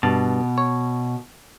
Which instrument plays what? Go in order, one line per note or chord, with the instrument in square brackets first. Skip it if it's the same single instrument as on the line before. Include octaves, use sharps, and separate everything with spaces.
[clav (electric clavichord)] G2 A5 [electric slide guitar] B2
[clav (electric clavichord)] C#5